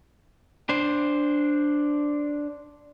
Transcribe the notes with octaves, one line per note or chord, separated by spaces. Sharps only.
D4 C5